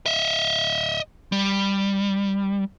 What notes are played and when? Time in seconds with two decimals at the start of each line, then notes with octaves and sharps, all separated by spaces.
0.06 D#5 E5
1.32 G3